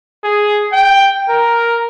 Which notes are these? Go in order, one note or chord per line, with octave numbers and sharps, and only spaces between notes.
G#4
G5
A#4